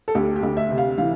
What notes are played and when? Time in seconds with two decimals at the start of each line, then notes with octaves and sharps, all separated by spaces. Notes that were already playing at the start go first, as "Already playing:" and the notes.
0.08 A4
0.15 D2 G4
0.36 G4
0.43 D2
0.57 E5
0.71 C3
0.78 F5
0.98 E3 F5